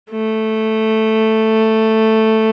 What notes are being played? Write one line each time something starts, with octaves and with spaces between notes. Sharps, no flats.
A3